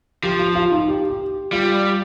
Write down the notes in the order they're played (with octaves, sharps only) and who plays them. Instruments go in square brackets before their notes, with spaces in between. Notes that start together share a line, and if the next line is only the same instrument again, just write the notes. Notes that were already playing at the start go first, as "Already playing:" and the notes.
[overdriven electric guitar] F3 [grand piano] G4
[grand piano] F4
F4
D#4
G4
G4
[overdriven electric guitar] G3 [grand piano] F4